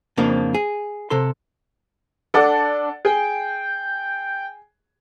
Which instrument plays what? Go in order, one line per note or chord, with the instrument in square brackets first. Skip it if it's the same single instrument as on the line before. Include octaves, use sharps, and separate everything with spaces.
[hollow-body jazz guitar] F2 C#3 F3 A#3 D4
G#4
C3 A4 C6
[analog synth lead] D4 [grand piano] A4 D5 F#5
[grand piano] G#4 [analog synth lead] G5